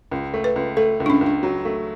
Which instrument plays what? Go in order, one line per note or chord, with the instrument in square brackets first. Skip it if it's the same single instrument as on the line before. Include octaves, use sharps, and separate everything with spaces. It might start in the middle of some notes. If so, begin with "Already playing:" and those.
[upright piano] C#2
A3
[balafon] B4
[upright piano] C#2
[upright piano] A3 [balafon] A4
[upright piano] C#2
[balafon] D4
C#4
[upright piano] C#2
[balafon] D4
[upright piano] F#3
A3